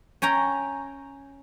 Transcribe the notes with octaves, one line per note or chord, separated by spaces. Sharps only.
C#4 C#5 G5 A#5